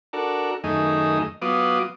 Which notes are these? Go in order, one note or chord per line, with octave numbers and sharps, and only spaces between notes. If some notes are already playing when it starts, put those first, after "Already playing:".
D4 F#4 A4 A#4
F#2 D#3 A3 D#4 G#4
F#3 B3 F4 D6 D#6